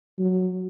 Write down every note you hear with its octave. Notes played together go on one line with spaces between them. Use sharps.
F#3